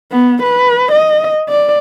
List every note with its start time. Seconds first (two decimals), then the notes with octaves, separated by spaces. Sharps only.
0.12 B3
0.43 B4
0.92 D#5
1.49 D5